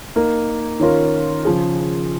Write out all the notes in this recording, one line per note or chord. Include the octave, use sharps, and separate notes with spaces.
A#3 D#4 A#4
D#3 C#4 F4 A#4
C#3 F3 C#4 G#4